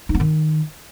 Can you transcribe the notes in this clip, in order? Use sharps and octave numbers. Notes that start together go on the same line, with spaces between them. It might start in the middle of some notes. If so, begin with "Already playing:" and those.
D#4
B3
D#3